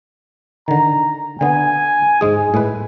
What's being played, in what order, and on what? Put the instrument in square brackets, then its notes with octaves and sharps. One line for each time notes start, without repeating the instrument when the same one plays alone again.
[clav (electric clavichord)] D3 D#3 [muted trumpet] A#5
[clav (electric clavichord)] D3 B3 [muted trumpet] G#5
[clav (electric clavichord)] G#2 G#3 G#4
A2 G#3 B4